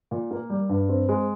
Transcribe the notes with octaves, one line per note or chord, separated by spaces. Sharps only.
A#2
A#3
G3
G2
C4
G#3